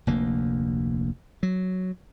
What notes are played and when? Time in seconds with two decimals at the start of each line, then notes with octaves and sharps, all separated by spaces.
0.07 F1 D2 A#3
1.43 F#3